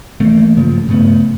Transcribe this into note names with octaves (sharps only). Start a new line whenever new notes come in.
E3 A3 A#3
G2 C#3 F3
G2 C#3 A3 B3